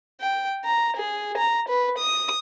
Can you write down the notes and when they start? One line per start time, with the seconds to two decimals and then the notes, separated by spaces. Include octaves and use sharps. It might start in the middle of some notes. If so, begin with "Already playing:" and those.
0.21 G5
0.65 A#5
0.96 G#4
1.38 A#5
1.69 B4
1.98 D#6